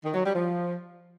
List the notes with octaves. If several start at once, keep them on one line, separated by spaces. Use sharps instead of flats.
D#3
F#3
G3
F3